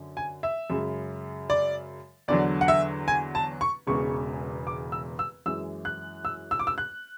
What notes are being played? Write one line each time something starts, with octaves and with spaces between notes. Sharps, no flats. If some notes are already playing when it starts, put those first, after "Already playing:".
Already playing: F#2 D3
G#5
E5
F#2 C#3 G#3
D5
E2 D3 F#3 D5
F#5
E5
G#5
A5
C#6
E1 E2 C#3 G#3 C#6
D6
E6
E6
F#2 E3 G#3 E6
F#6
E6
E6
D6
E6
F#6